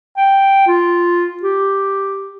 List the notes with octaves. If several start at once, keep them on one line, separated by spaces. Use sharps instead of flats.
G5
F4
G4